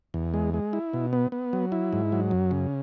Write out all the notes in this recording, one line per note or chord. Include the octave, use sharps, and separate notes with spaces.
E2
G#3
G#3
E4
B2
B3
B3
F#3
E4
G#2
F#3
F#2
C#3